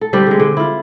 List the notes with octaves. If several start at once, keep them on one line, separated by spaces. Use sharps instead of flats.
A4
D3 G3 C4 G4
D3 G#3
D3
E4 F4